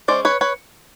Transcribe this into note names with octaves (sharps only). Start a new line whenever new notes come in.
G#3 C#4 C5 D5
B4 C#5
B4 C#5